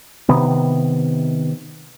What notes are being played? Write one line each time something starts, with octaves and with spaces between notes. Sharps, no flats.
C3 D#3 B3